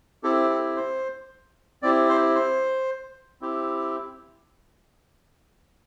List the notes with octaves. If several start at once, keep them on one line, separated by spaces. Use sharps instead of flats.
C4 E4 G4 A4
A4
C5
C4 E4 G4 D5
C5
C5
C4 E4 G4